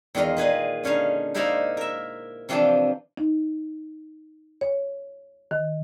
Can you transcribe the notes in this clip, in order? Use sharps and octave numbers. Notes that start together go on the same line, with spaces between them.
E2 D#3 F4 A#5 C6
A#2 G#4 B4 D#5
D3 C#4 D#4 F5
D#4 E4 A#4 C5 D5 F5
A#4 E5
C3 E3 F3 D4 G5 A5
D#4
C#5
D#3